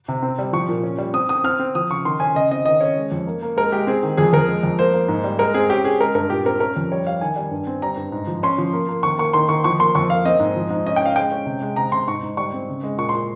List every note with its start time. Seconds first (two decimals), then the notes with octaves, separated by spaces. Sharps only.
0.08 C3
0.22 C4
0.39 G3
0.53 F3 C#6
0.69 A#2
0.83 C#4
0.98 G3
1.14 C4 D#6
1.29 C4 D#6
1.44 C4 F6
1.59 C4
1.75 F3 D#6
1.89 C#3 C#6
2.05 D#3 C6
2.20 C#4 G#5
2.35 C#3 D#5
2.51 C4 D#5
2.66 D#3 D#5
2.81 C#4 C#5
2.96 G#3
3.12 F2
3.27 A#3
3.42 A#3
3.56 G#3 A#4
3.72 G#3 G4
3.87 C4 G#4
4.03 D#3
4.17 F2 G#4
4.33 F2 A#4
4.48 G#3
4.63 F2
4.79 A#3 C5
4.93 A#3
5.08 G#2
5.24 G3
5.39 G#3 A#4
5.54 C4 G#4
5.70 C#4 G4
5.84 C#4 G#4
6.00 G#3 A#4
6.15 G2 A#4
6.30 A#2 G4
6.45 C4 A#4
6.60 C#4 A#4
6.76 F2
6.91 G3 C#5
7.06 G3 F5
7.21 D#3 G#5
7.36 G3
7.51 G2
7.67 C4
7.82 G3 A#5
7.97 G2
8.12 G#2
8.27 F3
8.43 C#4 C6
8.58 F3
8.73 A#3
8.88 A#3
9.03 D#3 C#6
9.18 A#3 C#6
9.33 D#3 C6
9.49 D#3 C#6
9.64 F3 C#6
9.79 A#3 C6
9.95 F2 C#6
10.10 A#3 F5
10.25 C4 D#5
10.40 G#2
10.56 F3
10.70 G#2
10.86 C#4 D#5
10.96 C#4 G5
11.06 F5
11.16 G#3 G5
11.32 C#4
11.46 C3
11.62 G#3
11.76 C3 A#5
11.92 C3 C6
12.08 G#2 C#6
12.23 G#2
12.37 G3 C#6
12.53 C4
12.69 C#3
12.83 G#3
12.98 A#2 C#6
13.09 C6
13.14 A#2